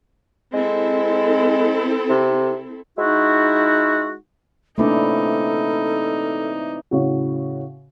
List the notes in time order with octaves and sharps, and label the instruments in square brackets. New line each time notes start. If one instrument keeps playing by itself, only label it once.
[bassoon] G#3 [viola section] C4 E4 A4
[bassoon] C3
[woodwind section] G#3 D#4 E4 F#4
[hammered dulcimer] C3 E3 D5 [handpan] A3 A#3 D4 [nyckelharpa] D#4 [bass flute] A4
[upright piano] A2 C#3 C#4 F#4